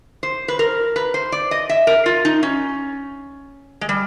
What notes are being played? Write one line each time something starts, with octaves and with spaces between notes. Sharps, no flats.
C5
B4
A#4
B4
C5
D5
D#5
E5
A#4
F4
D#4
C#4
G#3
G3